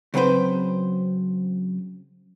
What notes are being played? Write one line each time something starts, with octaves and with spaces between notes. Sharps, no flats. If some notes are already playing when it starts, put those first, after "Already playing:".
C#3 F#3 C4 B4 C5